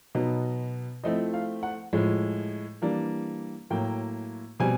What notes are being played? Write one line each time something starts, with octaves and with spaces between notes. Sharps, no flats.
B2 F#3 B3 D#4
F3 A3 C4 E4 D#5
F5
F#5
A2 F3 G#3
E3 G3 A#3 D4
A2 F#3 A#3 G5
B2 G3 C4 G#5